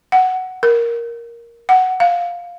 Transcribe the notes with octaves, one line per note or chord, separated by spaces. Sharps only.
F#5
A#4
F#5
F5